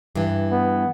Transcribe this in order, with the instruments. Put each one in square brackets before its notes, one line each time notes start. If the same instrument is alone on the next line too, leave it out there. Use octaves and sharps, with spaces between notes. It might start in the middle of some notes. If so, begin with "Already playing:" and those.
[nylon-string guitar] G2 E3
[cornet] B3